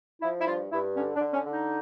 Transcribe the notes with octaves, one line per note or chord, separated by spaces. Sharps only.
F3 E4
E4
G2 F4
G2 E4
D3 C#4
D4
D3
C#4
D3
D#4